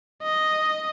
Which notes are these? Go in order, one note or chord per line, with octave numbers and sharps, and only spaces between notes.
D#5